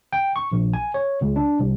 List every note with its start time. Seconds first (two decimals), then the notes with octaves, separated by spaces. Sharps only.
0.13 G5
0.36 C#6
0.52 A#1
0.74 G#5
0.94 C#5
1.21 C#2
1.36 D4
1.59 C2